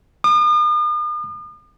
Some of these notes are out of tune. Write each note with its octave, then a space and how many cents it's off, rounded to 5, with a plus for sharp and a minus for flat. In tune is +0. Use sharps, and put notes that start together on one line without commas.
D#6 -45